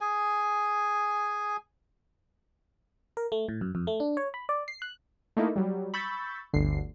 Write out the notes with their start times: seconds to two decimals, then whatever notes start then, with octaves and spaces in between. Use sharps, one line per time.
0.01 G#4 G#5
3.17 A#4
3.32 A3
3.48 A2
3.61 F#2
3.75 F2
3.87 A3
4.00 D4
4.17 C#5
4.34 B5
4.49 D5
4.68 C7
4.82 F#6
5.37 A3 A#3 D#4 E4 A4
5.56 F#3 G3
5.94 B5 C#6 E6 G6 A6
6.53 G1 D2 D3 C7